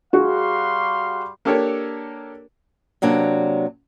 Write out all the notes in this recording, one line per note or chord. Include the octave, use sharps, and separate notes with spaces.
G3 F#4 G#4 F5 C6
A#3 D4 G4 A4 A#4 C#5
C3 F#3 A#3 D4